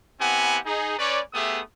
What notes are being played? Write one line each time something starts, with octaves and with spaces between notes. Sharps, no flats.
B3 C4 E4 G4 F#5 G#5
D#4 G#4
C#4 B4 C#5 D5
A3 B3 G4 G#4 E5 D#6